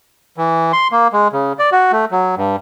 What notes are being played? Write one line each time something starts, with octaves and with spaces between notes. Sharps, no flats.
E3
C6
A#3
G#3
C#3
D5
F#4
A3
F#3
G2